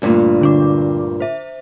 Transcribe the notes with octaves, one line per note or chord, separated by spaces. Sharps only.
D2 G2 A#2
D3 D4 D6
C5 E5